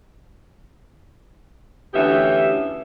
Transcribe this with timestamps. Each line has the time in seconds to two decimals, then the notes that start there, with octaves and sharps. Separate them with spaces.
1.94 D2 E3 B3 C#4 G4 E5